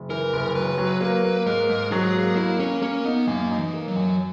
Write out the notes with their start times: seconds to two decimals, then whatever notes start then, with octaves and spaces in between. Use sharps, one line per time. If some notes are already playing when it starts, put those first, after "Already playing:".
Already playing: F#1
0.10 E3 A#4
0.33 F#1
0.55 F#3 B4
0.78 F#3
1.01 A#3 B4
1.24 A#3
1.46 G#2 A#4
1.69 G#2
1.92 F#3 G#4
2.15 A#3
2.37 A#3 E4
2.59 A#3 C#4
2.82 A#3 C#4
3.05 B3 D#4
3.27 F#2 A#3
3.51 D#4
3.58 E3
3.73 A#3
3.88 F#3
3.96 F#2